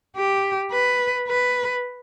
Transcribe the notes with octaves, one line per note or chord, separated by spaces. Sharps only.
G4
B4
B4